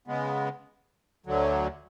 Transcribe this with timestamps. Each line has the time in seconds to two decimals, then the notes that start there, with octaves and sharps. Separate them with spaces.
0.07 C#3 G#3 B3
1.26 D2 D3 F#3